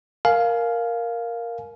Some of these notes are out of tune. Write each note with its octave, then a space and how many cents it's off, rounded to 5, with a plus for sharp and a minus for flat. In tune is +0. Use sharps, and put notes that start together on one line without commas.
A#4 +0 F5 +0 G#5 +35